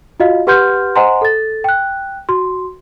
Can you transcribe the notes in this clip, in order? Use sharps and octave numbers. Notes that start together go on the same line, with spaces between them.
F4 F#4 D#5 F5
G4 B4 F#5 C6 F6 G6
C5 D#5 F#5 G#5 A#5 C6
A4 A6
G5 F#6
F#4 C6